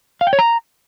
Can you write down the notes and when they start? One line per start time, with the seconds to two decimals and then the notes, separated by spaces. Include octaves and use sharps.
0.21 F5
0.27 G5
0.33 C#5
0.39 A#5